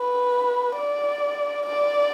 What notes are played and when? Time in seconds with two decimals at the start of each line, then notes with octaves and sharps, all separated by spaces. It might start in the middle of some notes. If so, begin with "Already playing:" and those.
Already playing: B4
0.77 D5
1.67 D5